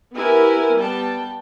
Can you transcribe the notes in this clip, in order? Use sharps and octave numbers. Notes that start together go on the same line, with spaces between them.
B3 E4 G4 A#4 G#5
G3 B3 G5 A5